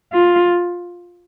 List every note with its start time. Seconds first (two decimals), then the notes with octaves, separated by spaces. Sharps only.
0.14 F4